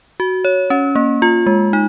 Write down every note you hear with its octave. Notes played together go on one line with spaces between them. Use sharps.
F#4
C#5
C#4
A#3
F4
G#3
D#4